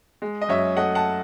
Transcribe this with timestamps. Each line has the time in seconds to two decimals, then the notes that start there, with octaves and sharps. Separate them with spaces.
0.22 G#3
0.42 D#5
0.49 F#2 C#5 E5
0.77 A3 D#5 F#5
0.95 F#5 A5